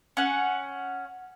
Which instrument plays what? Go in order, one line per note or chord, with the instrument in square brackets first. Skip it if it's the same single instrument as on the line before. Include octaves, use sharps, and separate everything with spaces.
[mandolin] C#4 F#5